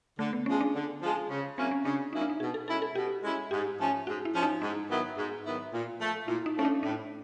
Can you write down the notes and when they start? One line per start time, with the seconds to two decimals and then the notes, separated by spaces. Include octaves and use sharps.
0.19 D3 A3
0.33 B3
0.46 F3 G#3 C#4
0.61 D4
0.74 D3
1.01 F3 G#3
1.30 C#3
1.58 F#3 A#3 C4 C#4 E4
1.71 C#4
1.84 C#3 D4
2.13 F#3 A#3 C#4 D#4 E4
2.21 D4
2.30 D#4
2.40 B2 G#4
2.54 A4
2.68 G#3 C#4 E4 A4
2.82 A4
2.95 B2 G4
3.23 G#3 C#4 E4
3.51 G#2 G4
3.79 F3 A3 C#4
4.07 G#2 F#4
4.25 E4
4.34 F3 A3 C#4
4.43 D#4
4.62 G#2 D#4
4.89 D#3 F#3 B3 E4
5.17 G#2
5.44 D#3 F#3 B3 E4
5.73 A#2
6.00 F3 A3
6.27 A#2 E4
6.46 D#4
6.56 F3 A3 C#4
6.65 D4
6.83 A2 D4